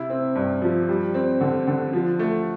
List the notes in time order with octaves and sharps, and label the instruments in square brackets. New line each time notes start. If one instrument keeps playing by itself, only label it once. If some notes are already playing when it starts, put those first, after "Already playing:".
Already playing: [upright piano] C3 E4
C4
G2
F3
G3
C4
D3
D3
F3
A3